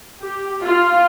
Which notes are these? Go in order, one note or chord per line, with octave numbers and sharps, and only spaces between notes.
G4
F4